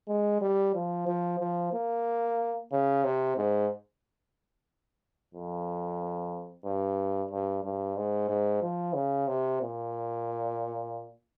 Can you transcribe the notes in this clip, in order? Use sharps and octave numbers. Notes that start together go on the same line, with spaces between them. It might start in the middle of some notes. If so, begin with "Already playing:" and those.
G#3
G3
F3
F3
F3
A#3
C#3
C3
G#2
F2
G2
G2
G2
G#2
G#2
F3
C#3
C3
A#2